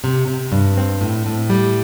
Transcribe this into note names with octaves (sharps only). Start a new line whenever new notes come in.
C3
C3
G2
C4
A2
A2
G3